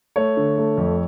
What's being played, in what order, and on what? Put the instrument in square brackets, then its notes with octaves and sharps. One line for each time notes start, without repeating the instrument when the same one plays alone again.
[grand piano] A3 C#5
D3
A3
F2